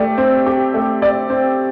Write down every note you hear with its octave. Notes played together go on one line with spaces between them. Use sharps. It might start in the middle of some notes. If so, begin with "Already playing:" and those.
Already playing: A3 G4 D5
C4
G4
A3
D5
C4